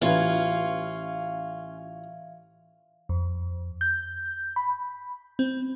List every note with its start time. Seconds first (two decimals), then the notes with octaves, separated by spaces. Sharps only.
0.02 A1 C#4 F4 B4 E5 F5 G#6
3.09 F2
3.81 G6
4.56 B5
5.39 C4